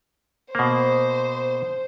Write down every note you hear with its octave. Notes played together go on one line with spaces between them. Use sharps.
B2 A#3 C5